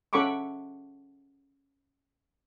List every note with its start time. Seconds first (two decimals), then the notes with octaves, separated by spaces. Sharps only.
0.13 C#4 A4 F#5 B5 C#6 D6